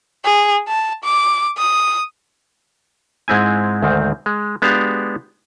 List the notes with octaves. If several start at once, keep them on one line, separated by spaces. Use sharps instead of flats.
G#4
A5
D6
D#6
G#2 G#3 C4 E4 G#5
D2 G#2 D#3 C4
G#3
G#3 B3 D4 F#4 G4 F5